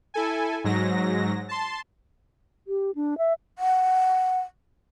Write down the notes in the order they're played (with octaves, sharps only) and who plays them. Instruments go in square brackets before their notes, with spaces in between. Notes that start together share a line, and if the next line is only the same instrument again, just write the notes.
[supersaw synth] E4 A4 G#5
G#2 F#3 A#6
A5 C6
[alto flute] G4
D4
E5
[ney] F#5